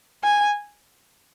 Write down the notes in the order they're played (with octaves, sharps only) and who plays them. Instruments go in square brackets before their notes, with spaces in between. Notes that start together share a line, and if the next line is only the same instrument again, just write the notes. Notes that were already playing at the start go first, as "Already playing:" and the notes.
[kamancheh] G#5